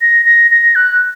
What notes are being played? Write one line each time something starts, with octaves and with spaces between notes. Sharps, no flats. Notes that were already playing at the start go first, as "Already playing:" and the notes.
A#6
A#6
A#6
F#6